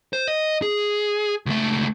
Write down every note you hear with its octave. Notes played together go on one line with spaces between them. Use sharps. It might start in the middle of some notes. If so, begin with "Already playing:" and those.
C5
D#5
G#4
C#2 A3